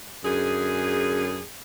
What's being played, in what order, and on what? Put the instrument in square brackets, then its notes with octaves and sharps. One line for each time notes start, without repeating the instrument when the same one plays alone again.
[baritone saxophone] F#2 [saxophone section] D3 G#4